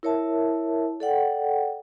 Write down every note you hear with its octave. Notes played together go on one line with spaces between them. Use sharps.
E4 A#4 C#5 E5 A5
A4 D5 F#5 G5